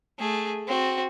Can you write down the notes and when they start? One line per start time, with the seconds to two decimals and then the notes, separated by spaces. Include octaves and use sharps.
0.19 A3 G#4
0.67 C4 F#4